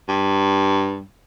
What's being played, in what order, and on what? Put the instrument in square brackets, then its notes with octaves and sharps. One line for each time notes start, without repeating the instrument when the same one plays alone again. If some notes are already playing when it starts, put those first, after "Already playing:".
[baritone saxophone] G2